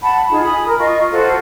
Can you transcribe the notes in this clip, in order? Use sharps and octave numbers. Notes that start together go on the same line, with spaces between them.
F#5 A5 B5
D#4 F4 G#4
G#5 B5 D#6
A#4
F4 D#5 C#6
F4 F#4 A4 C5